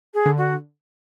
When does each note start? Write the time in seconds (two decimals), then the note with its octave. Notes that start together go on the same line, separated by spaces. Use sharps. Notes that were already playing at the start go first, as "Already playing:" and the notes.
0.13 G#4
0.26 D3
0.37 F#4